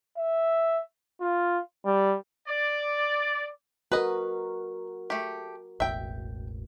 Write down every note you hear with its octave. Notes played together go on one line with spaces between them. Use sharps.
E5
F4
G3
D5
F#4 A#4 B4 D#5
A3 G4
E1 A1 E5 G5